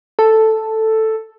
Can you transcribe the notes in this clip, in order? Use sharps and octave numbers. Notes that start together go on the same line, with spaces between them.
A4